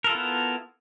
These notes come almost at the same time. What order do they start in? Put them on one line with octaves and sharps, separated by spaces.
A#4 A4 F4 E4 B3